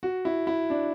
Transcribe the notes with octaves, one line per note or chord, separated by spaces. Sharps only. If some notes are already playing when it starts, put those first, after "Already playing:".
F#4
E4
E4
D4